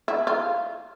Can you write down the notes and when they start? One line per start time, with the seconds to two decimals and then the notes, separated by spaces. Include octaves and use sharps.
0.08 E4
0.27 F4